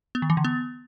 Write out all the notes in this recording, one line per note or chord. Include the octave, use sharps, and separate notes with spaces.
B3
D#3
E3
D3
B3